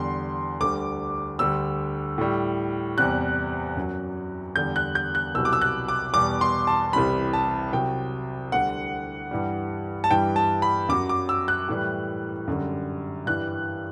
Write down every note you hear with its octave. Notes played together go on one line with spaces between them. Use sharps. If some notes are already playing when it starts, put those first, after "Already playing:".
Already playing: E2 D3 G3 C6
D2 D3 G3 D6
D2 D3 G3 E6
A2 G3
E2 C3 G3 F#6
F#2 F#3
E2 D3 G3 G6
F#6
G6
F#6
C2 B2 F#3 E6
D6
E6
F#6
D6
E2 B2 G3 D6
C6
A5
C2 C3 E3 G3 B5
A5
C2 C3 F#3 G5
D2 D3 G3 F#5
G2 E3 G3
A5
G2 E3 G3 G5
A5
B5
F#2 F#3 D6
D6
E6
F#6
A2 E3 G3
F#2 D3 G3
G2 E3 G3 F#6